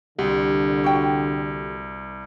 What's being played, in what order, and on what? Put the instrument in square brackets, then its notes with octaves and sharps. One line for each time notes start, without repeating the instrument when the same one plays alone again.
[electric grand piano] C2 [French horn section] D3 [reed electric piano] G4 [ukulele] F#5
[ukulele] F#4 G5